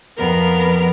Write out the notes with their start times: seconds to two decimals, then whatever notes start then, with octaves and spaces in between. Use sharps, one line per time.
0.17 F2 B3 A#4 F6